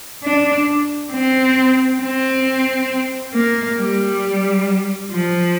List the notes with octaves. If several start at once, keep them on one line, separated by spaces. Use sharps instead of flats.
D4
C4
C4
A#3
G3
F3